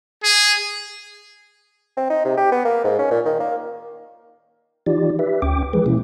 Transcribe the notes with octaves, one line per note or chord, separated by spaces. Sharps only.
G#4
C4
D#4
C3
G4
B3
A#3
G#2
C#4
A#2
D#3
A#3
E3 D#4 F4 G4 D5
G4 B4 E5
D2 C#4 G5 D6
E3 F3 G#3 G#4 B4
B2 A#3 C#4 E4